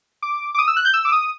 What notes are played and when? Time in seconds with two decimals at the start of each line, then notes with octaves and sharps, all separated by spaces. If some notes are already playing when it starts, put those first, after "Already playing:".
0.22 D6
0.55 D6
0.58 D#6
0.68 E6
0.76 F#6
0.85 G6
0.94 E6
1.05 D6
1.12 D#6